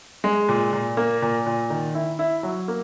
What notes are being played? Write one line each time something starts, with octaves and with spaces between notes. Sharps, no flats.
G#3
A#2
A#2
A#3
A#2
A#2
D#3
E4
E4
F#3
A#3